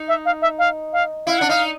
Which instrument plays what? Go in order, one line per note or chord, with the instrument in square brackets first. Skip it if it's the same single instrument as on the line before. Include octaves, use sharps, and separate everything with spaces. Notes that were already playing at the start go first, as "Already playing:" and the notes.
Already playing: [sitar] D#4
[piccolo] E5
F5
E5
F5
F5
[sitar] E4 [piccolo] F5
[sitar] D4 [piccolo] F#5
[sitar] D#4 [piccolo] F5